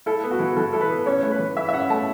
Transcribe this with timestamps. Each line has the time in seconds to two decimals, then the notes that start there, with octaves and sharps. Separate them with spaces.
0.06 E4 A4
0.24 B3
0.31 F#4
0.39 E3
0.57 E3 A4
0.73 E4 A4
0.81 B4
0.90 B3
1.06 C#4 C#5
1.23 A3
1.32 B4
1.39 E3
1.57 E4 E5
1.69 E5
1.73 C#4 F#5
1.90 A3 A5